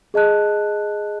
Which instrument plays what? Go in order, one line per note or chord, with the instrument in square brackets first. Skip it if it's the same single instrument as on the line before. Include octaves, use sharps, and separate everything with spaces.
[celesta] G#4 D#5 A5 F#6